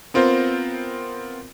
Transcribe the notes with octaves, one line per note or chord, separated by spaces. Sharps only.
B3 C4 F4 A#4 C5